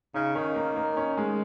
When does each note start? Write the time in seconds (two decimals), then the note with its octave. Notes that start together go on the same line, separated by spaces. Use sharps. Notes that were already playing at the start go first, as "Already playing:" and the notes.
0.14 C#3 D#4
0.35 D#3 C#4
0.55 A#3
0.76 A#3
0.97 C#4
1.18 G#3